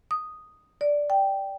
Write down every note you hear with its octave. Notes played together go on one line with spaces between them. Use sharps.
D#6
D5
G5